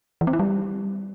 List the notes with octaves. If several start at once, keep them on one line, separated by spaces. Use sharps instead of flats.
E3
C4
E4
G3